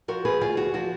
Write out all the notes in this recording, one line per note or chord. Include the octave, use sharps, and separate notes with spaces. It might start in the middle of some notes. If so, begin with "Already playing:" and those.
F3 F#4 A#4
G#4 B4
D2 F4 G#4
F#4
F3 F#4